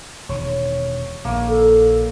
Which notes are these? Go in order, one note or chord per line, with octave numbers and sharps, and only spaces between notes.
E1 D#3 C#5
A#1 D#3 A#3
A4